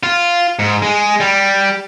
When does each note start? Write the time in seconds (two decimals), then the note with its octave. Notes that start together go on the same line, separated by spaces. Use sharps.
0.03 F4
0.59 G#2
0.82 G#3
1.20 G3